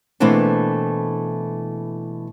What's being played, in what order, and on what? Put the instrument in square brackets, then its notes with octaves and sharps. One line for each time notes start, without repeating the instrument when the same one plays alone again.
[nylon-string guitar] B2 E3 A3 A#3 C4 D4